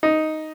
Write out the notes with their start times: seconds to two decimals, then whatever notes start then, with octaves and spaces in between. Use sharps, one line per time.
0.03 D#4